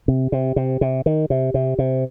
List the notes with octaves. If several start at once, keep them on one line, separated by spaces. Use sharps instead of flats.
C3
C3
C3
C3
D#3
C3
C3
C3